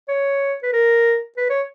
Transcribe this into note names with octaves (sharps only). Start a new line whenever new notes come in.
C#5
B4
A#4
B4
C#5